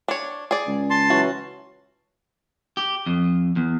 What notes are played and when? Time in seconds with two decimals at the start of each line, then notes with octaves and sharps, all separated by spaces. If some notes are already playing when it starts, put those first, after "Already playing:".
0.08 D4 C#5
0.51 G#4 D5
0.67 C#2
0.90 A5 C6
1.10 E3 F#3 C#4 F#4
2.77 G4
3.06 F2
3.56 E2